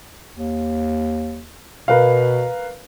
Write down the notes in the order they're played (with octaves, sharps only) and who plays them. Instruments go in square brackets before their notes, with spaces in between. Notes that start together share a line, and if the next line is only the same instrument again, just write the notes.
[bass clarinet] D#2
[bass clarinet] B2 [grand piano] A#4 B4 F5